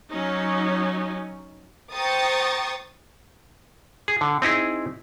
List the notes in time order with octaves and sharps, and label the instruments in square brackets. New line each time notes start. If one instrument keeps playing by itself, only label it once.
[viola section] F#3 C#4 D#4
[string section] C5 G5 A#5 C#6 D#6 A6
[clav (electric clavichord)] G#4
D3
C4 D#4 E4 G#4